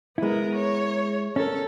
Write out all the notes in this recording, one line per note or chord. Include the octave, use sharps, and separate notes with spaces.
G#3 B3 E4 A#4
C#5
C#4 A4 A#4